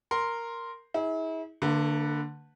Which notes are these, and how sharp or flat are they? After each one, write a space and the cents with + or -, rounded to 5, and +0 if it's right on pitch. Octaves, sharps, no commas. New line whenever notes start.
A#4 -5 C6 +0
E4 -40 G#4 +0
D3 +5 A#3 -45 B4 -10